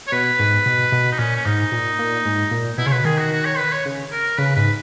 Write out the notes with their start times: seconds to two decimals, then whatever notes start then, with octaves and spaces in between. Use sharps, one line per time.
0.08 C#5
0.12 B2 B4
0.39 G#2
0.66 B2
0.92 B2
1.12 D#4
1.18 A#2 C#4
1.36 C#4
1.45 G#2 D#4
1.72 A#2
1.99 A#2
2.25 G#2
2.51 A#2
2.78 B2 E4
2.86 C#3 C#5
2.92 B2 B4
3.05 D#3 G#4
3.18 F#4
3.32 F#4
3.45 C#5
3.58 B4
3.72 C#5
3.85 C#3
4.12 A#4
4.38 C#3 B4
4.56 G#2 B4